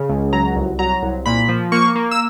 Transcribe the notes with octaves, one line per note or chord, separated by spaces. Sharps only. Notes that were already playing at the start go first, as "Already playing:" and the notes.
Already playing: C#3
C#2
F#3 A#5
C2
F#3 A#5
C2
A#2 B5
F3
A#3 C#6
A#3
E6